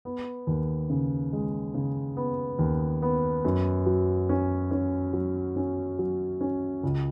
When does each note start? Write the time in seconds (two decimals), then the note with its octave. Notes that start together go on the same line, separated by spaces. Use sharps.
0.05 B3
0.47 D#2
0.90 C#3
1.33 G#3
1.74 C#3
2.17 B3
2.59 D#2
3.02 B3
3.45 F#2
3.86 F#3
4.29 C#4
4.71 C#4
5.13 F#3
5.56 C#4
5.99 F#3
6.41 C#4
6.83 C#2